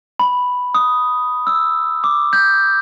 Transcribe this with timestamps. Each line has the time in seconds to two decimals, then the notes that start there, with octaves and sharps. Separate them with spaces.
0.20 B5
0.74 D#6
1.47 E6
2.04 D6
2.33 G6